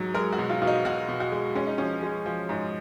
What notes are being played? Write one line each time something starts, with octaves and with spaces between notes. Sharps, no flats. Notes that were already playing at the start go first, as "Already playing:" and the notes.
Already playing: G#2 F#3
G#3 A#4
F#4
B2
F4
B2 F4
D#4
B2 F#4
B2
F#4
G#3
G#3 C#4
D#4
F3 C#4
G#3
F3
G#2